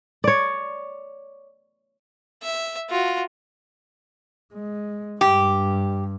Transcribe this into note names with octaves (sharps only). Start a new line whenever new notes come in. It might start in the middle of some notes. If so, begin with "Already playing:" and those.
C#5 D5
E5
F4 F#4
G#3
G2 G4